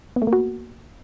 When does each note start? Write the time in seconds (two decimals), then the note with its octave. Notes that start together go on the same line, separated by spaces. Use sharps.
0.16 B3
0.22 A3
0.27 A#3
0.33 F#4